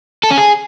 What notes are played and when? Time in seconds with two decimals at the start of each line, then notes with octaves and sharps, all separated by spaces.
0.23 A4
0.31 C#4
0.38 G#4